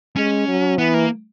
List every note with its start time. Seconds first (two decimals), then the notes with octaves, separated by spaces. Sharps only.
0.16 G#3 C#4
0.48 F#3
0.78 E3 B3
0.94 A#3